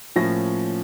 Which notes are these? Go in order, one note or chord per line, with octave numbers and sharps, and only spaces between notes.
A2 F3 A#3 C#4 A#6